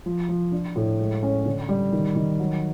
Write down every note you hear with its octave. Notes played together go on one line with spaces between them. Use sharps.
F3
F3
D4
A2
G#3
C#4
D3
G3
D#3
D#3
F#3